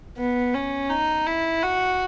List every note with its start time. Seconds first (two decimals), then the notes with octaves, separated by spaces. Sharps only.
0.18 B3
0.55 C#4
0.90 D#4
1.27 E4
1.63 F#4